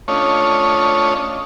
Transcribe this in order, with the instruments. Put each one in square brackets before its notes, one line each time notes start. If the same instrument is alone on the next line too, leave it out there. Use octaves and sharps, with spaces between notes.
[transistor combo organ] A3 C#4 D4 F4 C#5 D#5